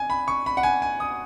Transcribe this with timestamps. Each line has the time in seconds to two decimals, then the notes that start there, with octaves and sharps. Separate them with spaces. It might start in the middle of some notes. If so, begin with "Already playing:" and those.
Already playing: G#5
0.10 B5
0.28 C#6
0.46 B5
0.57 F#5
0.63 G#5
0.82 G#5
1.00 D#6